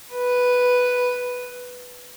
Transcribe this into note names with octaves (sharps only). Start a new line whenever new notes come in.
B4